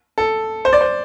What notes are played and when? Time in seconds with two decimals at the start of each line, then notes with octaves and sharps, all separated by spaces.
0.18 A4
0.65 C5
0.73 D5
0.81 C5